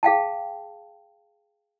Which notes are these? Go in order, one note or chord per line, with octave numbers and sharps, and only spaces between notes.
G#4 F5 G5 A5